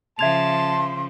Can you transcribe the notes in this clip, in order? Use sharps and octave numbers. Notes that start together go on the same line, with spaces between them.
C#3 F3 E5 A5 C6 G#6 F7